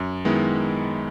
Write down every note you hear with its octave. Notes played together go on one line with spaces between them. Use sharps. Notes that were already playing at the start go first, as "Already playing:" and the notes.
Already playing: F#2
D#3 G#3 B3 E4